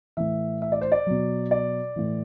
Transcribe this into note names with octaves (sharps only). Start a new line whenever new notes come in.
A2 E3 E5
E5
D5
C5
D5
B2 F#3
D5
A2 E3